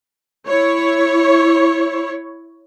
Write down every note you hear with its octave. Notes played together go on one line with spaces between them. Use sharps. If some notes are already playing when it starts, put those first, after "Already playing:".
E4 C#5